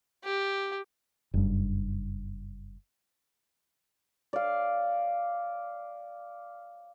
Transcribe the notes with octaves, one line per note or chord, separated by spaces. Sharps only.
G4
F#1 G2
D5 F5